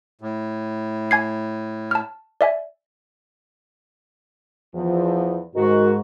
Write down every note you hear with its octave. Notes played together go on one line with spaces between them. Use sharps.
A2
G#5 G#6 C7
A5 F6
D5 E5 G#5
E2 F3
G#2 D#3 F#4